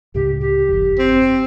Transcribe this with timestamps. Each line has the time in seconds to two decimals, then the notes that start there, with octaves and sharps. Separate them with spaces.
0.15 C#2 A2 C#3 G4
0.41 G4
0.68 G1 F2
0.99 C4